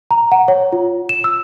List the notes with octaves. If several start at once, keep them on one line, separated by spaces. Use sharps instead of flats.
A#5
F#5
C#5
F4
E7
E6